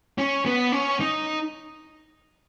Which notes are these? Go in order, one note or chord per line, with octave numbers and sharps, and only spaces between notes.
C#4
B3
C#4
D#4